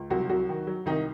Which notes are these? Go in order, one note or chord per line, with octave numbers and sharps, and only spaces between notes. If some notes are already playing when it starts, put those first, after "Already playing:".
Already playing: C#2
C2 F#3 F#4
C2 F#3 F#4
D#3
F#3
C2 D#3 D#4